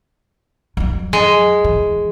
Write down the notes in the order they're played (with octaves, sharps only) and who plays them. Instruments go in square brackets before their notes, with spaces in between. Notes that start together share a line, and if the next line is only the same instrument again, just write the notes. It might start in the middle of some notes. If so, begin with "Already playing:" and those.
[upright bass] F2 F#3
[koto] G#3
[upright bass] E3